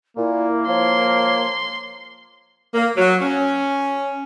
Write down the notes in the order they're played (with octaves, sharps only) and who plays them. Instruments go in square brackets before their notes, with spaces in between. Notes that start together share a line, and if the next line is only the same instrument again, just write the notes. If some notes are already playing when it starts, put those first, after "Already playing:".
[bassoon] A#2 [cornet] A#3 [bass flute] E4
[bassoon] F3 [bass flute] C#5 [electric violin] C6
[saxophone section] A#3
F#3
C#4